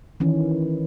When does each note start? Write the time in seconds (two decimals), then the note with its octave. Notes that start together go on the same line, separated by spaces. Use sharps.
0.20 D#3 E3 C#4